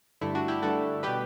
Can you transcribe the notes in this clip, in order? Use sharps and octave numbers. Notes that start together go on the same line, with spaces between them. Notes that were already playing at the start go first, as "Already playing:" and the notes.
G2 D3 A3 E4
D4 F#4
E4 G4
G2 D3 A3 F#4 A4
B2 G3 G4 B4